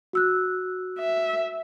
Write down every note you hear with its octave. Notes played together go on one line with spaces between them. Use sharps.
F#4 E6 F#6
E5